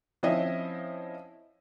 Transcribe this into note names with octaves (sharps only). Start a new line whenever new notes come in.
F3 C4 C#4 E4 D#5 E5